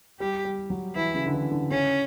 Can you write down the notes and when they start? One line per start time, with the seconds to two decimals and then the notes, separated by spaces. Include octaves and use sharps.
0.20 G3 G4
0.45 G3
0.70 F#3
0.95 E3 E4
1.15 C#3
1.26 D3
1.33 E3
1.52 D3
1.71 C#3 C#4